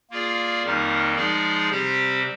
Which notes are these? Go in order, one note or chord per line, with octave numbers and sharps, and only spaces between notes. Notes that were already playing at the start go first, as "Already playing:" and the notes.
A#3 F4 G#4 D5
F2 D#3 G3 A#3 D#4
F3 G#3 D#4 G#4 D5
C3 G3 C4 G4 C5